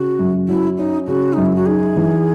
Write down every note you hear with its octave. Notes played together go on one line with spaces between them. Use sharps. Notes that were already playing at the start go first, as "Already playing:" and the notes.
Already playing: C#3 F#4
F#2
F#3 E4
C#4 D#4
C#3 F#4
F#2 D#4
E4
F#4
D#4 G#4
E3